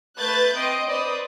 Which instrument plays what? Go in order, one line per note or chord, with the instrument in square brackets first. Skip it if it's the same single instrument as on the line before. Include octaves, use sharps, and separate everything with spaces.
[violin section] A3 B4 F#6 G6 A6
C4 D#5 C6 D7
B4 C5 D5 D#6